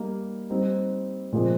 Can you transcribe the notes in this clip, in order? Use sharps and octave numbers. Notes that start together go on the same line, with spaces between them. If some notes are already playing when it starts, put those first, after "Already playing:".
Already playing: G3 A#3 D#4
G3 C4 D#4
A#2 F3 G#3 C4